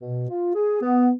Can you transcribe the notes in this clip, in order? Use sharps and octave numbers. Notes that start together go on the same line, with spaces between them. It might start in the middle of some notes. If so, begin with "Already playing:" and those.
B2
F4
G#4
B3